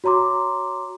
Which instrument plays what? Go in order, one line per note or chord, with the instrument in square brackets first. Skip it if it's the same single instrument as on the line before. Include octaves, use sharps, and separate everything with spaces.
[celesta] F#4 C#5 A#5 C6 D6